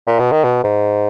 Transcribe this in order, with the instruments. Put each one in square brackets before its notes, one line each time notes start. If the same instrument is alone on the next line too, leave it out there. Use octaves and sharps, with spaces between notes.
[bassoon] A#2
B2
D#3
B2
G#2